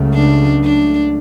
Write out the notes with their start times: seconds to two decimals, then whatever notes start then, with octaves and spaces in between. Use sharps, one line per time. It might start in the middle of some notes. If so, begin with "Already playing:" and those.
Already playing: C#2 C#3 F#3 A3
0.14 D4
0.64 D4